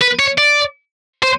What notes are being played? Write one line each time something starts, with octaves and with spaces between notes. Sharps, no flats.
B4
C#5
D5
C5